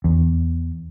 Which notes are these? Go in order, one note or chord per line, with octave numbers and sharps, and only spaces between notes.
E2